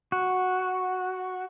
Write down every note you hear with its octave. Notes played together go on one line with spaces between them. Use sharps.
F#4